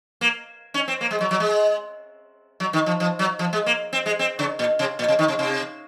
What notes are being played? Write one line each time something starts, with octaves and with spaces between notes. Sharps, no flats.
A#3
C#4
C4
A#3
G#3
F#3
F#3
G#3
F#3
D#3
F3
F3
F#3
F3
G#3
A#3
C4
G#3
C4
C#3
A#2
C3
A#2
C3
D#3
C3
C3